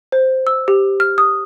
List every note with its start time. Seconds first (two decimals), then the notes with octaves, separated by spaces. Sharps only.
0.12 C5
0.47 E6
0.68 G4
1.00 F6
1.18 D#6